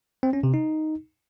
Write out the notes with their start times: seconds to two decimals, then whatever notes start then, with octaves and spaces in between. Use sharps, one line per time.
0.23 C4
0.33 C#4
0.43 C3
0.54 D#4